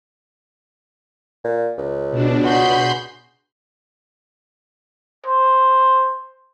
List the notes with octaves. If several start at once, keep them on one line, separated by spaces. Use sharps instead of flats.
A#2
C#2
B2 D4
F#4 G#4 B5 C6 G6
C5